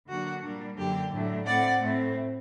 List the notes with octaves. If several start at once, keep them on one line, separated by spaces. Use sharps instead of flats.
D3 F#3 A#3 D4 F#4
A#2 G3 A#3 D4
F#2 D3 F#3 A#3 D4 G4
A2 F#3 A3 D4
A2 A3 C4 D5 F#5
A2 A3 C4